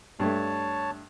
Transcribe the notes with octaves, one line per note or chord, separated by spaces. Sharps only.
G2 A3 C#5 A5